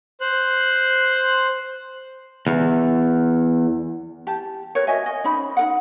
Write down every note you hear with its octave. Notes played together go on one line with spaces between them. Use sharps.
C5 F#6
E2
G4 A5
A#4 B4 C#5
F#4 D#5 E5 G#5
D#5
C#4 D#4 C5 B5
D#4 A#4 F#5